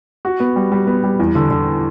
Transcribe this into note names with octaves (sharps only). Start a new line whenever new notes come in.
F#4
B3
G3
G3
B3
G3
E2
D3
D3